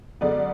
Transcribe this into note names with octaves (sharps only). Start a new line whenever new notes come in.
F#2 D3 G#3 B3 D5